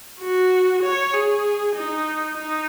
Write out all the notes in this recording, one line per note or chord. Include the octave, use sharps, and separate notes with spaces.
F#4
C#5
G#4
D#4
D#4